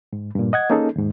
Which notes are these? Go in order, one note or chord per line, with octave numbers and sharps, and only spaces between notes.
G#2
G2 A#2
D#5 F#5 G#6
A#3 C#4 D#4 G#4 A4
D#2 G#2